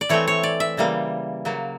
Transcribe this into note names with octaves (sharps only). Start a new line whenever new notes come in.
D5
E3 A3 C4 C#5
C#5
D5
E5
C#3 E3 G3 A#3
C#3 F#3 A#3